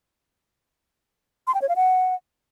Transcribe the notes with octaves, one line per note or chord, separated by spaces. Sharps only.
C6
G5
C#5
F5
F#5